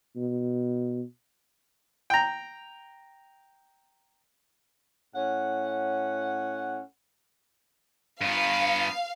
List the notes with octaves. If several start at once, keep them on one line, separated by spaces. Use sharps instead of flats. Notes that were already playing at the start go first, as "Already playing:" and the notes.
B2
G5 A#5
A2 C#4 F#5
G2 B3 F5